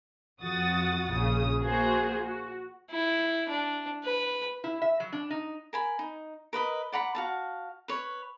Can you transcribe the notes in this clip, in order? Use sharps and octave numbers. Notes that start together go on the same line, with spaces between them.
F2 F#4 F#5 D#6 A6
A#1 C#3 D#6
A#3 F#4 G#4 C5
F#4
E4
D4
B4
E4
E5
F#3
D4
D#4
A#4 G#5 B5
D#4
A#4 B4 D#5 B5
D5 F#5 A#5 B5
F#4 F5 A5
B4 C#5